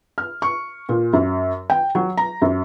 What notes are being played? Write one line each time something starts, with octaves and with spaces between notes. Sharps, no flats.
F6
C#6
A#2
F#2
G5
F#3
A#5
F#2